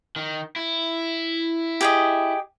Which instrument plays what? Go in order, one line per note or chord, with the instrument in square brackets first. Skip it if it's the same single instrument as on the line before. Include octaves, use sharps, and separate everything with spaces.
[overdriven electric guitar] D#3
E4
[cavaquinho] G4 G#4 D#5